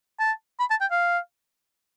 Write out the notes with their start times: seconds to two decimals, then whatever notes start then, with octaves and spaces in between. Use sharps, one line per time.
0.20 A5
0.60 B5
0.70 A5
0.81 G5
0.91 F5